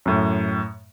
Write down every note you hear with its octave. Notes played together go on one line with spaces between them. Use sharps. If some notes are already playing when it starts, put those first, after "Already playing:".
F#2 A2